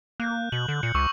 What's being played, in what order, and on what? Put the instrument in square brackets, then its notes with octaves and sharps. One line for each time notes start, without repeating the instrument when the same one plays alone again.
[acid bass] A#3 [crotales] F#6 G6
[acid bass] B2 [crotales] F#7
[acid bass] D3
[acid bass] A#2 [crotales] C#7
[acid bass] C#2 [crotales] C#6 D6 E6